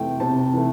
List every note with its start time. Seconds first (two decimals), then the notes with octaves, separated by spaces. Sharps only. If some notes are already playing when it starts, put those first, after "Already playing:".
Already playing: C3 E3 A3 G5
0.20 C3 A5
0.53 E3 A3